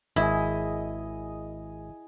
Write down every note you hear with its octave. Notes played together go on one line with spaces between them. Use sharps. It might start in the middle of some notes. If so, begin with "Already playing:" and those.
G#1 E4 G#4 D#5